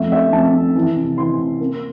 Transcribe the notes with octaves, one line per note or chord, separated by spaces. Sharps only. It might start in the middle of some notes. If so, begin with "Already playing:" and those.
Already playing: F2 A3 E5
A3 E5
F2 A5
F2
E3
C3
E3 C6
C3
A#3